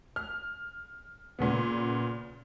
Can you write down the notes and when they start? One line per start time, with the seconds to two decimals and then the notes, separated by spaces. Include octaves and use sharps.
0.16 F6
1.39 A#2 C#3 B3